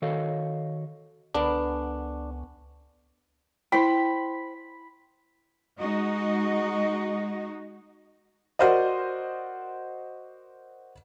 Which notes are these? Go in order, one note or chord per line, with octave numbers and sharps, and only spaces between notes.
D#3 F#4 A4 C#5 D#5 F5
C#2 D3 B3 D4 A#4
E4 C5 G5 B5
G#3 D#4 F#4 D#5
F#4 A#4 C5 D5 D#5